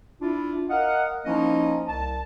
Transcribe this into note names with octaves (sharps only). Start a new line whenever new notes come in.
D4 E4 F4
A#4 D#5 F5 F#5
F3 A#3 C#4 D#4 E4 D#5
C2 A5